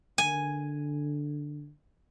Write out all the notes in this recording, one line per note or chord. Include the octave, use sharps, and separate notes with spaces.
D3 G#5